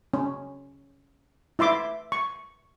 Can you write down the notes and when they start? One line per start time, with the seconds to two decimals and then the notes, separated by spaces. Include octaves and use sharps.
0.14 C#4
1.59 E4 E5 C6 D6
2.12 C#6